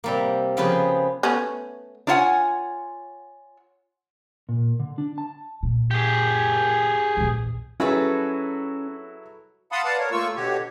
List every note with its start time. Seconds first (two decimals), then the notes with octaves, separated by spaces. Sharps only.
0.04 C3 G3 A#3
0.57 C#3 F3 B3 G4 G#4 B4
1.23 A3 B3 C#4
2.07 D4 F4 C#5 E5 F#5 G#5
4.49 A#2
4.79 D3
4.98 D4
5.18 A5
5.63 A#2
5.91 G4 G#4
7.17 A#1 E2
7.80 F#3 C#4 E4 F#4 G#4 A4 B4
9.72 F5 F#5 A5 B5 C6 D#6
9.84 B4 D5 F5 F#5 A5
9.98 A#4 C#5
10.12 A3 A#3 F4 C#6 E6
10.36 B2 D3 F#4 G4 C#5